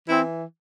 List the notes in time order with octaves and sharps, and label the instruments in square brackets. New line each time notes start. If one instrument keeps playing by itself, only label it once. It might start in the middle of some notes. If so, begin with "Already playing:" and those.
[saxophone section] E3 C4 E4